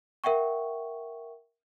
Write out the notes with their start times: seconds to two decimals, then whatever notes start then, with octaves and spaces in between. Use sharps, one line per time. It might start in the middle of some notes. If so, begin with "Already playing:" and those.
0.24 A#4 E5 F#5 G5 C#6